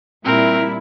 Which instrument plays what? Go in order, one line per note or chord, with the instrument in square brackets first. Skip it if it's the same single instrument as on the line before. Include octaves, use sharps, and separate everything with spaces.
[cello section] A#2 G3 E4 [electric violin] C4 A#4